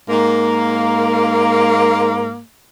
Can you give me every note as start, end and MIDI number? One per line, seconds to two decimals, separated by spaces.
0.09 2.39 44
0.09 2.39 58